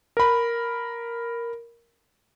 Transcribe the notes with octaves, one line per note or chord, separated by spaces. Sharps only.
A#4 B5